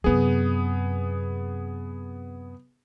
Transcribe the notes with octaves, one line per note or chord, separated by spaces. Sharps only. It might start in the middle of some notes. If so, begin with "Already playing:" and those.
F#2 C3 B3 G#4